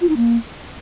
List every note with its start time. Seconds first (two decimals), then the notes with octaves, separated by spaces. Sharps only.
0.01 F4
0.09 D#4
0.17 A#3